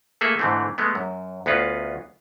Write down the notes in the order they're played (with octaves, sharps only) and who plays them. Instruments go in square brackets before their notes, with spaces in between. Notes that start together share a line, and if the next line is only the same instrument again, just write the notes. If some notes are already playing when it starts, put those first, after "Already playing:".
[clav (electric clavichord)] A3 A#3 G#4 A4 E5
G#2 D3 E3 A3 C4
G#3 A3 B3
F#2
D2 B3 C#4 F4 B4